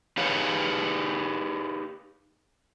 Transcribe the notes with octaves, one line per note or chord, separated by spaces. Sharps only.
D#4 G4 G#4 B4 C#5 F5